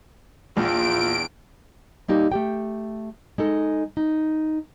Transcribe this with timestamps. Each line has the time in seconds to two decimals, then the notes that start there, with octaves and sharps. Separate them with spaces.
0.57 A#1 E2 F4 D7
2.08 G3 A#3 D#4 G4
2.32 A3 G4 G5
3.38 G#3 D#4 A4
3.97 D#4